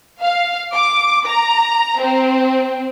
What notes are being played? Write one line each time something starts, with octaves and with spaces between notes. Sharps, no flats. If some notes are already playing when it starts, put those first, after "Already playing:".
F5
D6
A#5
C4